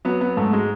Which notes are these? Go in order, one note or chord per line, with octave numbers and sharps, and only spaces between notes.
F#3 B3
B3
G#2 A3
G#3